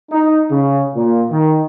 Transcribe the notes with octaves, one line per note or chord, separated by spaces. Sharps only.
D#4
C#3
A#2
D#3